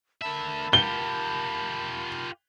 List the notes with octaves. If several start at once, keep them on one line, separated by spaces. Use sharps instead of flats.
D3 A#4 E5 A5 B5
F4 G4 G7